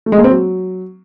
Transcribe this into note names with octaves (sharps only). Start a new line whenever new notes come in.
A3
G#3
A#3
C4
F#3